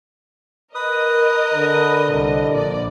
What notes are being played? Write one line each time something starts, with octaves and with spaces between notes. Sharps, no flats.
A#4 B4 D#5 D#6
D3
C2
A#1 D5